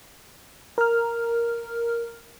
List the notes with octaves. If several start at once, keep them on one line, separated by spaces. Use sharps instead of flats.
A#4 F6